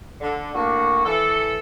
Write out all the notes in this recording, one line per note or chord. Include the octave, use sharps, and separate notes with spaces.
D3
A2 A#3 D4 F#4
E3 A4